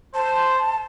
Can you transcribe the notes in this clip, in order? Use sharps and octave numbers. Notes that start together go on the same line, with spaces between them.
C5 A5